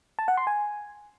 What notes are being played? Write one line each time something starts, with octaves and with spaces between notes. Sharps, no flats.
A5
F#5
C6
G#5